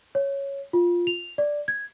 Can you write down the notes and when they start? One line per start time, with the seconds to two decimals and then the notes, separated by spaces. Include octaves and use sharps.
0.15 C#5
0.73 F4
1.07 F7
1.38 D5
1.68 G#6